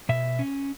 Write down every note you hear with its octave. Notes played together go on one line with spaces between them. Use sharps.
B2 E5
C#4